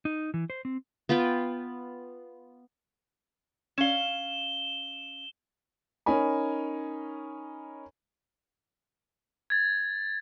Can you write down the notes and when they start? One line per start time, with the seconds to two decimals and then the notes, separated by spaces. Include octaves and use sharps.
0.05 D#4
0.34 E3
0.50 C5
0.65 C4
1.09 B3 F4 B4 G5
3.78 C#4 F5 E7 G7
6.06 C#4 D#4 A#4 G#5 B5
9.50 G#6 A6